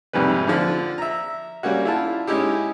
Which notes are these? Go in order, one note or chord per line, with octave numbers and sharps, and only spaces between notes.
C2 F2 G#2 G3 B4
D3 F3
E5 A#5
G3 A#3 C#4 F#4
E4 F4 A5
G#3 C#4 D#4 E4 G4